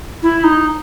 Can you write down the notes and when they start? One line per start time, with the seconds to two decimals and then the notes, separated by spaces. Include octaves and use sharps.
0.23 E4
0.44 D#4